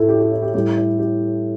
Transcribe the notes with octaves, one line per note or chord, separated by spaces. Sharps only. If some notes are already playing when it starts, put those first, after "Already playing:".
Already playing: A2 A3 E4 A4
G4
G4
E4
G4
A2 G3 E4 G4
E4
G4